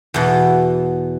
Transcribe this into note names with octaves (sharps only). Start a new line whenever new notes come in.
E2 B2 E3